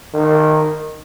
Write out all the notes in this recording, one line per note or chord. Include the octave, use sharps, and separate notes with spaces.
D#3